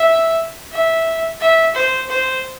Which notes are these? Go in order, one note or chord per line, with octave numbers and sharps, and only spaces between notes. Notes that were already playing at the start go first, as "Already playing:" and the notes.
Already playing: E5
E5
E5
C5
C5